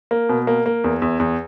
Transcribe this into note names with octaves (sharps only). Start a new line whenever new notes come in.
A#3
B2
A#3
A#3
E2
E2
E2